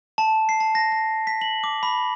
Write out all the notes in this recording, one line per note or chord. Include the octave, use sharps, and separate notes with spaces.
A5
C7
A5
A#6
A#6
B6
F#7
D6
B5